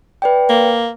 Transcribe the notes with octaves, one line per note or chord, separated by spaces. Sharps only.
B4 D5 G5
A#3